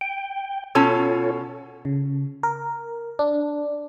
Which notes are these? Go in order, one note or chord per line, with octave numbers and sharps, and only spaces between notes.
G5
B2 C#4 F4 A4 C#5 A5
C#3
A#4
D4